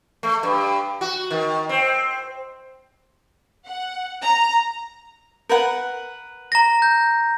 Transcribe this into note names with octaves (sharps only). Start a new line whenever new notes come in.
A3
G2
F#4
D#3
C4
F#5
A#5
A#4 B4 F#5
A#5 A#6
G6